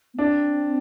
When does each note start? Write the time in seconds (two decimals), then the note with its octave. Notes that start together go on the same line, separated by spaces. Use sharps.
0.14 B3
0.19 C4 D4